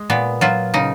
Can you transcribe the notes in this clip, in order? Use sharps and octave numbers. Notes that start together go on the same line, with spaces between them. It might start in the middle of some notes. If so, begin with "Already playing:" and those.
Already playing: G#3
A#2 B3
F#3 F4
C#3 D#4